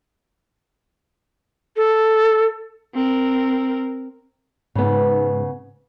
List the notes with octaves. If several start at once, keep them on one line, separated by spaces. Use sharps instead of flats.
A4
C4 A#4
G#2 C#3 B3